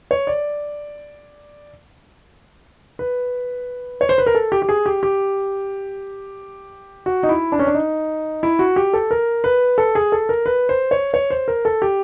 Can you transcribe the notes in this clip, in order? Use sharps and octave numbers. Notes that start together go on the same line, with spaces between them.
C#5
D5
B4
C#5
C5
B4
A#4
A4
G4
G4
G#4
G4
G4
F#4
D#4
E4
D4
C#4
D4
D#4
E4
F#4
G4
A4
A#4
B4
A4
G#4
A4
A#4
B4
C5
C#5
C#5
C5
A#4
A4
G4